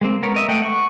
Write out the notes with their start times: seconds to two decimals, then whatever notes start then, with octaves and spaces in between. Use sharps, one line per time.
0.01 G#3 A#3 C4
0.23 B3 A#4 C#5
0.34 A#4 D#5 E5
0.48 A3 D#5 F#5 G5
0.62 F#5 C#6